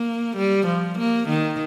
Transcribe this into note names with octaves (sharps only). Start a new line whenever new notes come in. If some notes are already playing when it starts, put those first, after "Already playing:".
Already playing: A#3
G3
F3
A#3
D#3